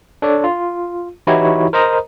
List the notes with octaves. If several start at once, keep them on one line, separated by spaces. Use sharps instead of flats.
D4 A4 C#5 D5
F4
E3 D#4 E4 F#4 G4 C#5
A#4 C5 D#5 A#5 D#6